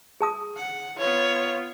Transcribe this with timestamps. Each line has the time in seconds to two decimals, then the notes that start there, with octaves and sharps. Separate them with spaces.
0.21 G#4 A5 D#6
0.56 F#5
0.98 B3 F4 C#5